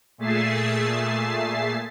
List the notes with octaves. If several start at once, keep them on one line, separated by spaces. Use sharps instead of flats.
A#2 A3 G#4 E5 A6 C7